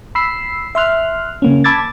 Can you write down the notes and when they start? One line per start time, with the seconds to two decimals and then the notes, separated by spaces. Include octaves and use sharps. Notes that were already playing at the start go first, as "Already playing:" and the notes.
0.15 B5 E6 C7
0.75 E5 C6 F6 F#6
1.42 C#3 A#3 C#4
1.64 A5 B5 D6 E6 G#6 A6